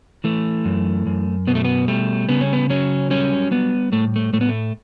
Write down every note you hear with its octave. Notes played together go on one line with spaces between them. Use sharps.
E3 A3
F#2
F#2
B2 B3
A3
B3
G3 A3
C#3 B3
C#4
B3
F#3 C#4
G3 C#4
G3 B3
A2 A3
A3
A2 A3
B3
A3